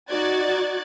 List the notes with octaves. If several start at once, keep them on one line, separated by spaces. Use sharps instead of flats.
D#4 F#4 D5 F#6 G#6 A6